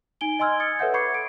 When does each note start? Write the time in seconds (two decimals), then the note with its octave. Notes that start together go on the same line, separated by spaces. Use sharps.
0.21 D#4 G#5 D7 G7
0.39 D#5 G#5 C6 E6 F6 G#6
0.60 D#6 G#6 A6 C#7
0.79 A4 B4 C#5 E5 F#5 G6
0.94 B5 C#6 D6 G#6 C7 C#7
1.14 D7